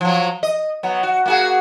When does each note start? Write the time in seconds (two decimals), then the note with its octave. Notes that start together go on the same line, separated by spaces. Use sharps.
0.01 F3 F#3
0.43 D#5
0.83 F#3 B3
1.03 F#4
1.26 A#3 F#4 G#4